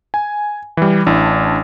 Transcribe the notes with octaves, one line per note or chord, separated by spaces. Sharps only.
G#5
E3 G3
A1 D4 E4